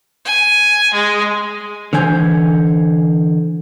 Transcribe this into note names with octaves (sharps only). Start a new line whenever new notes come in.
G#5
G#3
D3 E3 C5 G#5